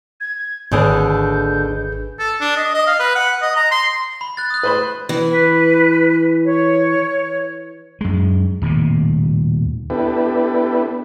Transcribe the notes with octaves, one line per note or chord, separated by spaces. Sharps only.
G#6
G#1 D#2 D3 D4 G#4 B4 G6
A4
D4
D#5
D#5
F5
B4
F#5
D#5
A#5
C6
B5
F#6 A6
D#6 F#6
B4 C5 B5
E3
B4
C#5
F#2 G#3
D#1 D#2 A2 C3
B3 D4 E4 G4 A4 B4